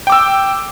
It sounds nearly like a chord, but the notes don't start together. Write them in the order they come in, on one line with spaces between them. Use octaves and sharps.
G5 D6 E6